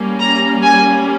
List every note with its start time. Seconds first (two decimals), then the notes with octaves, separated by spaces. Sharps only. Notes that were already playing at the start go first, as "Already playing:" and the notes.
Already playing: G3 A#3 C#4
0.19 A#5
0.62 G#5